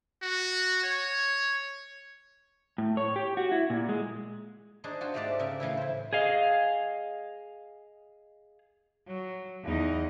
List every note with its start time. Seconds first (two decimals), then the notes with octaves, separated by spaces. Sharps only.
0.22 F#4
0.83 C#5
2.78 A2
2.97 C#5
3.16 G4
3.37 F#4
3.52 E4
3.70 A#2
3.89 G#3
4.84 D4 D#4 G#4 C5
5.01 F4 F#4 C5
5.14 G#2 G#3 A3 G4 D5 A5
5.39 C#3 A#4 D5 E5
5.60 A2 C#3 E3 E4
5.77 E4 C5
6.13 G#4 D#5 F5
9.07 F#3
9.64 E2 D#4